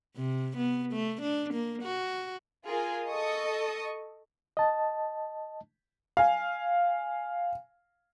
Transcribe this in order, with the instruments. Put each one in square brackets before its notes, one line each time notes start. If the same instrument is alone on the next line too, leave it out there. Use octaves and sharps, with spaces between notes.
[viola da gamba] C3
B3
A3
D4
A#3
F#4
[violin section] F4 G#4 A#4 G#5
A4 D#5 C#6 D#6
[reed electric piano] D#5 A5
[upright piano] F5 G#5